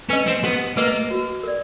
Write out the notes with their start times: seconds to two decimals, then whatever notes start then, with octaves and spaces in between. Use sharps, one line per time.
0.09 C#4 B4 D#5
0.27 C4
0.43 B3 G4
0.77 A#3 B4 D#5
1.11 F#4
1.43 A#4 D5